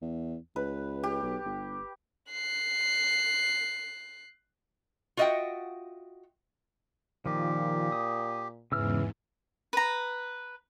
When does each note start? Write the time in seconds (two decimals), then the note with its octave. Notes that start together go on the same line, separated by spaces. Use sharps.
0.02 E2
0.56 C#2 B4
1.03 G4
1.23 B1
1.45 G1
2.31 F#6 C7
5.17 F4 F#4 D#5 E5 F#5 G5
7.26 A#2 D#3 F3 G4
7.92 D#6
8.72 E2 G#2 C#3 E3 E6 F6
9.73 B4 A#5